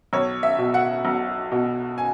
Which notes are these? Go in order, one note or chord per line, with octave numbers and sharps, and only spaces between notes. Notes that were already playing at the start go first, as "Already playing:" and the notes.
B1 C#5
E5
B2
F#5
B1
B2
G#5